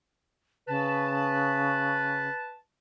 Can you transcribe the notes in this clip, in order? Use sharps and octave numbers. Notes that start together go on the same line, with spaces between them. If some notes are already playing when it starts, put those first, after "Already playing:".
C#3 B4 A5